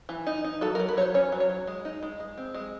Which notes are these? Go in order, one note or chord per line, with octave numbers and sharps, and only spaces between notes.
E3
D#4
D#4
F#3 A4
A#4
F#3
B4
F#3 C5 C#5
C#4 C#5
F#3
C#5
F#3
G#3
D#4
G#3
G#3
C4
G#3